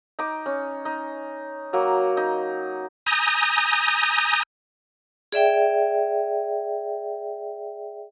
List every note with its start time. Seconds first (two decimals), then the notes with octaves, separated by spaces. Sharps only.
0.19 D#4 D6
0.46 C#4
0.85 D#4
1.73 F#3 A#3
2.17 D#4
3.06 G#5 A#5 D#6 G6 A#6
5.32 G#4 D5 E5 G5